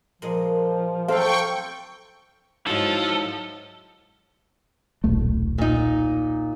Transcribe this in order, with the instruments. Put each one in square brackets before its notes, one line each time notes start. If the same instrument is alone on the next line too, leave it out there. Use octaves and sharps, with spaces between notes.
[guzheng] A#2 G#3 D#5 [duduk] F3
[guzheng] F#3 C4 [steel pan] A4 C5 F5 [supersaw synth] G5 C#6
[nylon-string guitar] G#2 F#3 E4 [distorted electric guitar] F3 [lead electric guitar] A4
[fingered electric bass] D#1 B1 A3
[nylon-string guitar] A#2 D#4